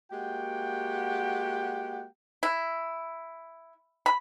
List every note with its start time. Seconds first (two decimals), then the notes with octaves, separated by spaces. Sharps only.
0.12 G#3 A#3 F#4 G4 F#5 G5
2.43 E4
4.06 B5